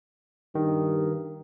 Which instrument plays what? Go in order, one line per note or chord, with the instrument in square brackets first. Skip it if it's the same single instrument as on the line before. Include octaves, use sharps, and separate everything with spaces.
[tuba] G2 [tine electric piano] D#3